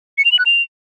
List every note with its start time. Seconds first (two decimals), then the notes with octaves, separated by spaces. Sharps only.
0.18 C#7
0.25 F7
0.32 F#7
0.39 F#6
0.46 F7